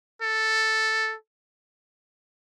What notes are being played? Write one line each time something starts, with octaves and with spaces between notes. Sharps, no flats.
A4